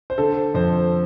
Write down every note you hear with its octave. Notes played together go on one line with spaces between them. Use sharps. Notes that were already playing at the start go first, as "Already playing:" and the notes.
C5
D3 A4
F2 C5